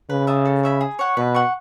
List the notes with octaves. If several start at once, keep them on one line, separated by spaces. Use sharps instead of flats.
C#3 B4
E5 A5 D#6
A4
C#5 E5 B5
G#4
C#5 F#5 C#6
B2 B4
F#5 C#6